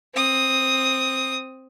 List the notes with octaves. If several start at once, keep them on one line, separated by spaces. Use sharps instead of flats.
C4 D#6